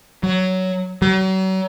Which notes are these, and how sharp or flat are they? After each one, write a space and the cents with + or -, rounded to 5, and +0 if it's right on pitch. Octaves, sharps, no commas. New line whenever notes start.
F#3 +10
F#3 +40